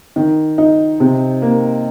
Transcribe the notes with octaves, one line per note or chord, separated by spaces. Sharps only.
D#3
D#4
C3
A#3